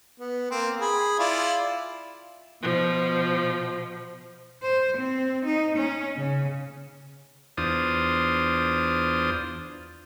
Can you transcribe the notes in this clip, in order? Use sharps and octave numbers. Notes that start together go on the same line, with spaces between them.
B3
A#3 C4
G#4 B5
E4 F4 D5
B2 F3
C5
C4
D#4
C#4
C#3
E2 D4 F4 C5 D#6